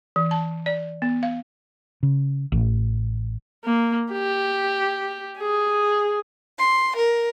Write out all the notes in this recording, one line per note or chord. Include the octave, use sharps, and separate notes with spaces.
E3
A5
D5
B3
F5
C#3
A1
A#3
G4
G#4
C6
A#4